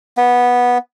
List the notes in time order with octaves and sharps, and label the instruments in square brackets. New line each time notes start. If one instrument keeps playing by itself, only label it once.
[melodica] B3